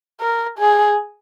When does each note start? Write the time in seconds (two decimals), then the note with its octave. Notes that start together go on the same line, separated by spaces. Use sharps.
0.20 A#4
0.58 G#4